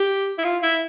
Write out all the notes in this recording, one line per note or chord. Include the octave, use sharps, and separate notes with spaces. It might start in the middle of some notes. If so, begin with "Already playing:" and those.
Already playing: G4
E4
F4
E4